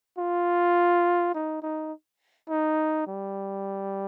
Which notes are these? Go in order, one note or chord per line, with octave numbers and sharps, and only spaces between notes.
F4
D#4
D#4
D#4
G3